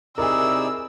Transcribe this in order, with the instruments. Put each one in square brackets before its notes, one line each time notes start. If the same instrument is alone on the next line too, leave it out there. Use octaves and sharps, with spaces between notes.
[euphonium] C3 [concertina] D#4 E4 D5 [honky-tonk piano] G#4 A#4 [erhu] E6